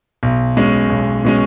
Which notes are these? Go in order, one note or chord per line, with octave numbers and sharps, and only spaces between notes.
B1
B2 G#3 C#4
B1
B2 G#3 C#4